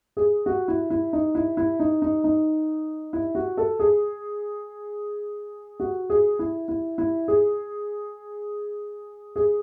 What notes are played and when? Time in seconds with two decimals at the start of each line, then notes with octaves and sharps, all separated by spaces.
0.17 G#4
0.46 F#4
0.68 E4
0.90 E4
1.13 D#4
1.35 E4
1.57 E4
1.79 D#4
2.02 D#4
2.24 D#4
3.13 E4
3.35 F#4
3.57 A4
3.79 G#4
5.80 F#4
6.10 G#4
6.39 E4
6.68 E4
6.98 E4
7.28 G#4
9.36 G#4